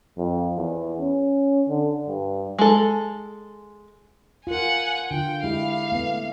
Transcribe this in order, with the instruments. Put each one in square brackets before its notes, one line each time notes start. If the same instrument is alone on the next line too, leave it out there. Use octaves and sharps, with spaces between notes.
[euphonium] F2
E2
C#4
D3
G2
[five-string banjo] G#3 A4
[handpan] F4 A#4 [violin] F#5 G#5
[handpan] D3 F4 [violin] G5
[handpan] G#3 E4 G4 [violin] F5
[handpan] A3 B3